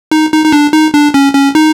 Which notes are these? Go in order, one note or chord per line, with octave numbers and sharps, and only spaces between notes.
D#4
D#4
D#4
D4
D#4
D4
C#4
C#4
D#4